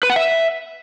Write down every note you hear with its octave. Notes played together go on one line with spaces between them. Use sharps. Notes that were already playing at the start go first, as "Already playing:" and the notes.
B4
F#5
E5